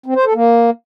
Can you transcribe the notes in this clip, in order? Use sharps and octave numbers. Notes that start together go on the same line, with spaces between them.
C4
C5
A4
A#3